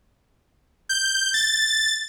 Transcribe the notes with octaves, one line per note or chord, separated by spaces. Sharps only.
G6
A6